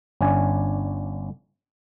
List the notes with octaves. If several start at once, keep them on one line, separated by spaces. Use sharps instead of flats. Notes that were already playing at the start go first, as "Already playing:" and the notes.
G1 C#4 D4 G#5